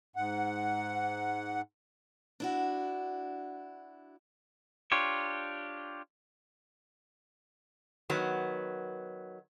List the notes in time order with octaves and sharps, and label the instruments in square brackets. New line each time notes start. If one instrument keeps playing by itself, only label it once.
[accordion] G#2 F#5
[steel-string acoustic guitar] D4 E4 F#4
[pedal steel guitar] D4 F4 G4 C#5
[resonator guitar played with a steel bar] D#3 F#3 B3